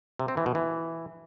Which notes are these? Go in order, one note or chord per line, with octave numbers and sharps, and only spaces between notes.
C3
C4
E3
B2
E3